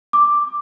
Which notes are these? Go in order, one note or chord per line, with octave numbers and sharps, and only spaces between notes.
D6